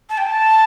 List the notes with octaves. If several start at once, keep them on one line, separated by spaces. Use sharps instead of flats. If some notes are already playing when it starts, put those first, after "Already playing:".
A5
G5
A5